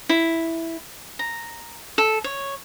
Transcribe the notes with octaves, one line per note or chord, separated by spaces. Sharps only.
E4
A#5
A4
C#5